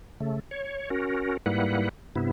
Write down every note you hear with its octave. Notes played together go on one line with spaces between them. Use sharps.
C#3 A3
C#5
C#4 F#4 A#4
G#2 G3 A#3 E4 B4 F#5
G2 C3 B3 E4